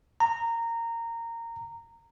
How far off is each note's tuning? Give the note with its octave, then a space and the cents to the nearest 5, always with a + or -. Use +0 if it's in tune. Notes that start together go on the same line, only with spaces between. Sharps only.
A#5 -15